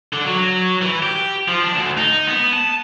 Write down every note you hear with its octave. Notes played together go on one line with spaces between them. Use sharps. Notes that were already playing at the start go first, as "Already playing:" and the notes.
D3
F#3
E3
G4
F3
D4
D2
D#4
B3
A5